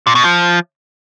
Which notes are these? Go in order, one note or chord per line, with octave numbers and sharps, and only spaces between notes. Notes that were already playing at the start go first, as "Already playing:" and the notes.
A#2
B2
F3